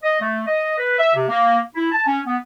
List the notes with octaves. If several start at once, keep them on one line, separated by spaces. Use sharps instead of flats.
D#5
A3
D#5
B4
E5
C3
A#3
E4
A5
C#4
B3